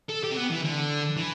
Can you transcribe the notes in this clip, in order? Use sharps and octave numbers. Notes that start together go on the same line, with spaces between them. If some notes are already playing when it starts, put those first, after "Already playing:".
A4
G4
C4
B3
E3
D3
E3